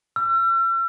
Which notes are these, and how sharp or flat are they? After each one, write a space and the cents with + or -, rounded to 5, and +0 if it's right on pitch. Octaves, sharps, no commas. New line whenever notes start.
E6 +45